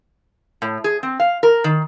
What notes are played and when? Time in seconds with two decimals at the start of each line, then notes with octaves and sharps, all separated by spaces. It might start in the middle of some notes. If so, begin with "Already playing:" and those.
0.62 A2
0.84 G#4
1.03 C4
1.20 F5
1.43 A#4
1.64 D#3